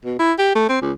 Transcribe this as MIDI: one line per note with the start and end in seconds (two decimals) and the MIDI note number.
0.05 0.17 47
0.19 0.33 64
0.38 0.54 67
0.55 0.68 57
0.69 0.80 60
0.82 0.92 37